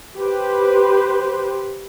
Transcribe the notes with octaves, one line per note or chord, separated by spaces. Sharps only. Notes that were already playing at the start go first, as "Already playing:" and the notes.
G4 B4 C5